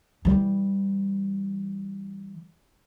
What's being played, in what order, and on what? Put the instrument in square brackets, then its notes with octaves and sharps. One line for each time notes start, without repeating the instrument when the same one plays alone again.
[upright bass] E3 G3